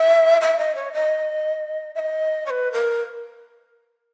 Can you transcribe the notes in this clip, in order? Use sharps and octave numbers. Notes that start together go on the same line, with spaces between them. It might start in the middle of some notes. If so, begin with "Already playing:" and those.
Already playing: E5
E5
D#5
C#5
D#5
E5
D#5
C#5
B4
A#4